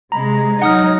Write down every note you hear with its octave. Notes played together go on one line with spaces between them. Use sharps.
C3 G#3 A#5 B5
F#3 D#4 F#5 D#6 F6